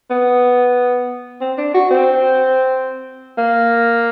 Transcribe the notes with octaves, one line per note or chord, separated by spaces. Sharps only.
B3
C4
D4
F#4
C4
A#3